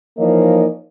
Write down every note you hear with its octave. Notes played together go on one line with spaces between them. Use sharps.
E3 F3 A#3 D#4 C#5 D#5